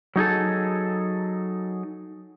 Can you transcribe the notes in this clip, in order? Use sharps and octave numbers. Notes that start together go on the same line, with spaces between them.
F#3 D#4 G#4 A4